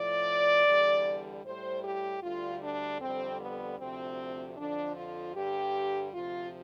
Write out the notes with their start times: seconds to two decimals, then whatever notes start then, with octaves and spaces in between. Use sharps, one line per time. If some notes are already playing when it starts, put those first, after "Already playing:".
Already playing: A2 F3 D5
0.66 E2 D3 G3
1.44 A2 G3 C5
1.83 G4
2.22 D2 D3 G3 F4
2.62 D4
3.01 F2 D3 G3 C4
3.40 B3
3.78 D2 C3 F3 C4
4.57 F2 D3 F3 D4
4.96 F4
5.34 G2 D3 G3 G4
6.13 D2 C3 F3 F4